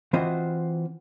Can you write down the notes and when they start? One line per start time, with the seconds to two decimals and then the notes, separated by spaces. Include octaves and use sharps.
0.13 E3 C4 F4 F#4 C5 D#5